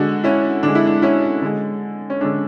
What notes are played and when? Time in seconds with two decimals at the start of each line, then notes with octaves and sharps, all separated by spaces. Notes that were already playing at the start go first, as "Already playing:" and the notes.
Already playing: D3 G#3 D4 F#4
0.24 C#4 E4
0.63 D3 G#3 D4
0.75 E4
0.87 D4
1.02 C#4 E4
1.42 D3 G#3
2.10 C#4
2.21 D3 G#3 D4